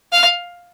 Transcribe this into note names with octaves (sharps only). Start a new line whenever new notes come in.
F5